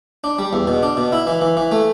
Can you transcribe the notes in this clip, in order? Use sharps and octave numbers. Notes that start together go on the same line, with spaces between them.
D4
G3
E2
B2
D4
B2
E4
E3
E3
E3
A3